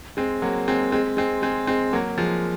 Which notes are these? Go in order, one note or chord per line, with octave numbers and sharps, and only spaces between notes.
G#3 C4
F#3 A#3
G#3 C4
G#3 C4
G#3 C4
G#3 C4
G#3 C4
F#3 A#3
F3 G#3